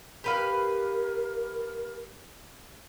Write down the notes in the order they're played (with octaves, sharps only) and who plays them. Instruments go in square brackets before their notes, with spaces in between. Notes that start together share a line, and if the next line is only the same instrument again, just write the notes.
[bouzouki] G4 B4 F5 [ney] A#4